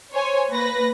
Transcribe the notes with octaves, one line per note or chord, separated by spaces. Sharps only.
C5 C#5 G#5
A#3 B4 A#6